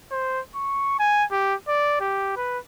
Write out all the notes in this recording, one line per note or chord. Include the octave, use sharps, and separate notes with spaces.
C5
C#6
G#5
G4
D5
G4
B4